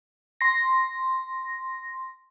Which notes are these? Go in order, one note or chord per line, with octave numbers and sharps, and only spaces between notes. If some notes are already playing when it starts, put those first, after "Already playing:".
C6 A#6